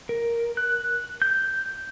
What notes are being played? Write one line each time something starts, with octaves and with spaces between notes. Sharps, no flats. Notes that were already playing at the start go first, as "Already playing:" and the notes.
A#4
F#6
G6